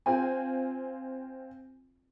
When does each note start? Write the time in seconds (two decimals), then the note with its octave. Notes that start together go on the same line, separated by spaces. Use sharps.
0.06 C4 F4 G#5